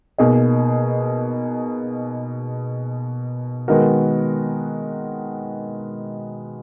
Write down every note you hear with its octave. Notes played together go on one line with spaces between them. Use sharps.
B2 A#3 D#4 G#4 D#5
D#3 G#3 B3 F#4 A#4